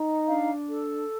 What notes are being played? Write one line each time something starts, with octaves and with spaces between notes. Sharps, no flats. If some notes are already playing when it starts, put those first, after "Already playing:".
Already playing: D#4
D4 F5
A4